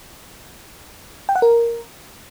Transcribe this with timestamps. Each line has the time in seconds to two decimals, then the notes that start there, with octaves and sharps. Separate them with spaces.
1.29 G5
1.36 F#5
1.42 A#4